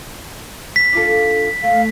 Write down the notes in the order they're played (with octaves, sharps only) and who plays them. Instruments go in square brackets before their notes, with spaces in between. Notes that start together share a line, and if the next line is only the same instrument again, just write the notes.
[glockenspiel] B6
[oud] D4 F4 A4
[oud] A3 [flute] F5